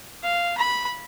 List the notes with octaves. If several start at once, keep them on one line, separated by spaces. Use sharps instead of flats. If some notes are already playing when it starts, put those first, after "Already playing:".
F5
B5